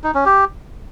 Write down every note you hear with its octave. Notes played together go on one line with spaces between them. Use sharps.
D#4
C#4
G4